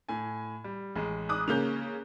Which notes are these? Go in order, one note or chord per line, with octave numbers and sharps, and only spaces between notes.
A2 G#5
G3
A1 G#3
D6 D#6 F#6
C#3 A#3 C#4 G6 F7